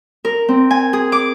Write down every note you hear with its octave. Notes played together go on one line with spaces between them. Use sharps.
A#4
C4
G#5
G#4
D6